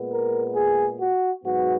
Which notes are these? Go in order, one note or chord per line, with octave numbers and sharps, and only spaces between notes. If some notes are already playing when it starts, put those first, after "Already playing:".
Already playing: A#2 G#3 B3
A#4
G#4
F#4
G#2 F#3 B3 F#4